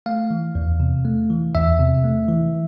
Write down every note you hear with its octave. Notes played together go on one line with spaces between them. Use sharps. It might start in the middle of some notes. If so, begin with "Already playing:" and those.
A3 F5
E3
E2
C3
A3
E3
E2 E5
C3
A3
E3